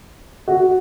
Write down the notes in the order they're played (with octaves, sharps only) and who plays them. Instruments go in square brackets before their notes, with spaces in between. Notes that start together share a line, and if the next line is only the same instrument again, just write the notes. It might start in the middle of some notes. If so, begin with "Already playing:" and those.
[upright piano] F#4